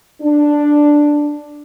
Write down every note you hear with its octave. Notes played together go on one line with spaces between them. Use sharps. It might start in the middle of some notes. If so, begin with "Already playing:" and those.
D4